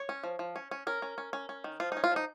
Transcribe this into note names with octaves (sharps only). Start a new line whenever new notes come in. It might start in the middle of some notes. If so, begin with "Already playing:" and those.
Already playing: C#5
C#4
F3
F3
C#4
C#4
C#4 A#4
C#4
C#4
C#4
C#4
D#3
F3 F4
C#4 D#4
F4
F3 D#4